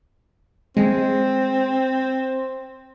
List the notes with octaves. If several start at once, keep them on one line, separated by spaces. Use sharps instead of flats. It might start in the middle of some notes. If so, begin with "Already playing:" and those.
G#3 C4